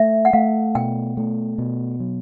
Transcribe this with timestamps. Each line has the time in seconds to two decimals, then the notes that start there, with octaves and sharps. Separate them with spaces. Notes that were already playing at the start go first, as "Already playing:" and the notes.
Already playing: A3 E5
0.25 F#5
0.33 A3 F5
0.75 B2 G5
1.17 A3
1.58 B2
2.00 F#3